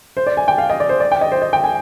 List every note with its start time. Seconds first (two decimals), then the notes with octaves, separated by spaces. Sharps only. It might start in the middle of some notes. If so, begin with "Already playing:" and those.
0.17 C5
0.27 D5
0.37 G#5
0.48 G5
0.58 F5
0.70 D#5
0.80 D5
0.89 C5
1.00 D5
1.12 G5
1.21 D#5
1.32 C5
1.42 D#5
1.53 G5
1.64 G#5